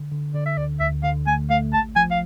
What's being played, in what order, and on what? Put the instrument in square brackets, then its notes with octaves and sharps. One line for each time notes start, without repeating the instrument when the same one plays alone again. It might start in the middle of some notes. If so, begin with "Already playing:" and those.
Already playing: [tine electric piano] D3
D3
[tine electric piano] D3 [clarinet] D5
[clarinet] E5
[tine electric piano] D2 [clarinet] D5
[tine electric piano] D2 [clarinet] E5
[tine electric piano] D3 [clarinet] F5
[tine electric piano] A3 [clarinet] G#5
[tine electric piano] A3 [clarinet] F5
[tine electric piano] A1 [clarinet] A5
[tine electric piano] F3 [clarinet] G#5
[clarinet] F5